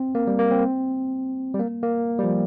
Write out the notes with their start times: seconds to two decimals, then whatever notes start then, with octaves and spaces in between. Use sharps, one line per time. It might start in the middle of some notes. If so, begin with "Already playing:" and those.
Already playing: C4
0.15 A#3
0.27 G3
0.39 A#3
0.51 C4
1.54 G3
1.59 A#3
1.83 A#3
2.19 G3
2.24 F3